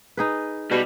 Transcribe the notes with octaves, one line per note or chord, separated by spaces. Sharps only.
D#4 G#4 B4
B2 G3